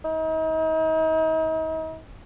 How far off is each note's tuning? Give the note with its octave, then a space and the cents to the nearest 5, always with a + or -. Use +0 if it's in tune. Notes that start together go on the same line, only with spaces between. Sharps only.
D#4 +40